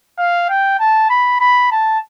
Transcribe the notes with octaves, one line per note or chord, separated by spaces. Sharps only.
F5
G5
A5
B5
B5
A5